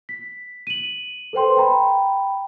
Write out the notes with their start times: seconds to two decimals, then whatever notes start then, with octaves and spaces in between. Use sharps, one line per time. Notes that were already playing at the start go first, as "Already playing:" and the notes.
0.09 B6
0.67 D#7 F#7
1.33 A4 B4 C5 G5 C6
1.57 G5 A#5 B5